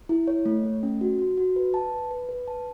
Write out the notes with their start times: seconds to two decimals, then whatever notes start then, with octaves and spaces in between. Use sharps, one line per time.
0.09 E4
0.27 C#5
0.45 A3
0.64 A3
0.83 C#4
1.01 F#4
1.19 F#4
1.37 F#4
1.56 B4
1.74 A5
1.92 B4
2.11 B4
2.29 B4
2.48 A5